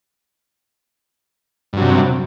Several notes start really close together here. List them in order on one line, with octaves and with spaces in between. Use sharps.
G2 F#3 C3